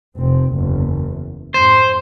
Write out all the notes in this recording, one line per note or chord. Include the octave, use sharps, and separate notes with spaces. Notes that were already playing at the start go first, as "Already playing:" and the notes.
F1 C4
F#1 E2
F2 G#2 C5